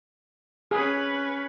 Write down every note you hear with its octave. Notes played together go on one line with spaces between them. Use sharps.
C#4 G#4 B4